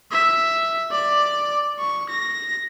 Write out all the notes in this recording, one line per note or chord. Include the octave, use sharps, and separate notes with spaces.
E5
D5
C#6
A#6